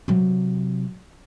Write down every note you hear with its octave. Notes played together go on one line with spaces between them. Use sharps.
C3 F#3